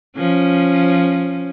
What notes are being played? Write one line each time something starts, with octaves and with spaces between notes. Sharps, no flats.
F3 C#4